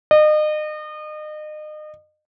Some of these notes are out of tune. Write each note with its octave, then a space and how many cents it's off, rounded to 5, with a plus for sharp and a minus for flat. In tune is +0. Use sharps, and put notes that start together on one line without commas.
D#5 -35